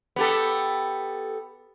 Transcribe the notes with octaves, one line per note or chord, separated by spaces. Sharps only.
B3 G4 A4